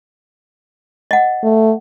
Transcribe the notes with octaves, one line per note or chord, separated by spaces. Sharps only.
D#5 F#5
A3